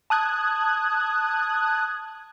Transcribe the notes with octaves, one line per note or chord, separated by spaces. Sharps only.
A5 D#6 F#6 G#6